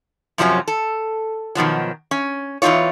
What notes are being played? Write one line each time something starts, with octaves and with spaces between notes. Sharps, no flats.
F#2 C3 F3 F#3 C#4
A4
B2 D#3 F3 F#3
C#4
E2 E3 C#4 D#4 F4 C#5